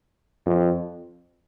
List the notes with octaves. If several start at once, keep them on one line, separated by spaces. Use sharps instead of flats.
F2